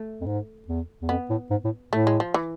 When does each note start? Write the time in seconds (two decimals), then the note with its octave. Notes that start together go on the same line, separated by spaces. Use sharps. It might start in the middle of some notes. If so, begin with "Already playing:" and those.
Already playing: A3
0.21 F2
0.26 G#2
0.68 E2
1.02 E2
1.09 F2 B3
1.30 A2
1.51 G#2
1.65 A2
1.93 A2 A3
2.07 G#3
2.20 F3
2.34 E3